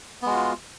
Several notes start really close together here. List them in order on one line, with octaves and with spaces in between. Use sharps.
B3 G#3 F#4 F4